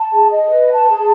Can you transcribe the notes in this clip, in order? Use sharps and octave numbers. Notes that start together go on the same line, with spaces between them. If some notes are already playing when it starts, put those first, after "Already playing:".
Already playing: A5
G#4
D#5
B4
A5
G#4